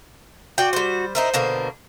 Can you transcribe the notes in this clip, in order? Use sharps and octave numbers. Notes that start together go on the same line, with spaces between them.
F#4 D5 G5
G3 C5
D#4 E4 A#4 C5
B2 D3 A#3